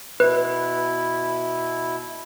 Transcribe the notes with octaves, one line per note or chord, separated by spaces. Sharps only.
B2 E4 B4